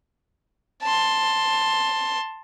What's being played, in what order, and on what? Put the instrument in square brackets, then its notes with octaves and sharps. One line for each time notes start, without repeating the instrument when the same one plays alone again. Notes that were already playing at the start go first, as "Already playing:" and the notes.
[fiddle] A5 C6